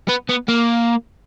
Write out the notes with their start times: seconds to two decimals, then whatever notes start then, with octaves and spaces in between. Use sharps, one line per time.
0.09 B3
0.29 B3
0.49 A#3